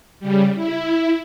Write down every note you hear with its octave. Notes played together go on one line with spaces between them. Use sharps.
C#3 G3
E4